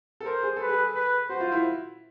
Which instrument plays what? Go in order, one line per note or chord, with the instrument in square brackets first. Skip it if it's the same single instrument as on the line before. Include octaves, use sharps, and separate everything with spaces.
[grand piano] A4
[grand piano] A#4 [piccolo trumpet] C5
[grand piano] G#4
[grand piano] A4 [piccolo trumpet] B4
[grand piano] G#4
[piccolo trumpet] B4
[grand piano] F#4 [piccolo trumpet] C5
[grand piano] F4
E4